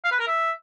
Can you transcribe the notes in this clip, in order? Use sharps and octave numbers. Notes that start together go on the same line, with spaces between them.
F5
B4
A#4
E5